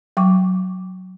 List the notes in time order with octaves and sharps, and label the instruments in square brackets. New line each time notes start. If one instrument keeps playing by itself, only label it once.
[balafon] F#3 G5 C#6 D6